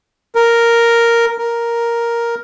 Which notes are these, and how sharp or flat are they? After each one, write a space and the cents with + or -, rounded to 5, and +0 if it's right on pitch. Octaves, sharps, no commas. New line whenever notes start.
A#4 +0
A#4 +5